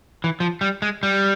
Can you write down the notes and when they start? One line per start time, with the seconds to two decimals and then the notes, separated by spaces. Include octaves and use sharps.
0.24 E3
0.40 F3
0.61 G3
0.82 G#3
1.03 G3